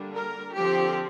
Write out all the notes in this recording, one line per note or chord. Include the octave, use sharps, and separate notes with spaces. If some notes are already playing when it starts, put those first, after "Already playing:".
Already playing: D3 G3 A#3 D4
A#4
D3 F3 C4 G4